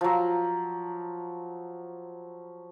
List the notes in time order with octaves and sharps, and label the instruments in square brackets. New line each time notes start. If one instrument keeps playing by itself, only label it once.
[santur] F3 F#3